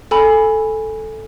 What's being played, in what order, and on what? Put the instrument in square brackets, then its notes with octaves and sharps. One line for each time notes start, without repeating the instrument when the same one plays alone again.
[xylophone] A4 G#5 B5